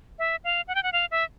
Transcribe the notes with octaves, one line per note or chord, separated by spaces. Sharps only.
E5
F5
F#5
G5
F#5
F5
E5